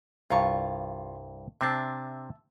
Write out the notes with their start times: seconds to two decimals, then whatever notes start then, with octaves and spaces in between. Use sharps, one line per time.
0.30 C2 G2 F4 A#5 C#6
1.61 C3 C4 D4 E5 A5